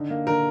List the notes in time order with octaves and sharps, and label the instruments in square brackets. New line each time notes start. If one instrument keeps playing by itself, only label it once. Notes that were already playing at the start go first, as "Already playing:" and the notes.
Already playing: [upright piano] D3 D#4
A#3
[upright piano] D3 [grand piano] A#4